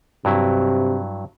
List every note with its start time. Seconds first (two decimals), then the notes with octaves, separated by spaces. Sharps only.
0.25 G2 C3 F#3 E4